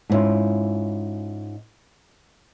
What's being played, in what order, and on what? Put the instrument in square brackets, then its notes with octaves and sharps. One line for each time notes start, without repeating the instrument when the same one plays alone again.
[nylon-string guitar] G#2 B3 C#4 E4 F4